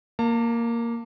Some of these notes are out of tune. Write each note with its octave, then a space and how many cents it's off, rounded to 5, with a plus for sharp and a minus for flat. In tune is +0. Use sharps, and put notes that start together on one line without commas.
A#3 +0 A5 +40